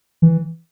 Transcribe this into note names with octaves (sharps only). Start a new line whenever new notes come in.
E3